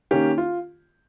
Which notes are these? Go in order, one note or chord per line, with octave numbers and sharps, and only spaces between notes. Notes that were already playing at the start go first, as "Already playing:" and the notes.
D#3 A#3 C#4 G4
F4